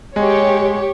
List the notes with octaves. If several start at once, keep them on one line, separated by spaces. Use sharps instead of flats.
G#3 G4 C#5